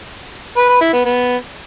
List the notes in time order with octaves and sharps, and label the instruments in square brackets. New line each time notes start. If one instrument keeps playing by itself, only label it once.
[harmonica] B4
B4
E4
B3
B3